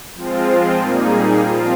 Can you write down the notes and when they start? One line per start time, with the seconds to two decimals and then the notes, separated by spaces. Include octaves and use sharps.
0.15 F3 G#3 C4 F4
0.77 A#2 G3 A#3 D#4 G#4
1.40 F3 C4 F4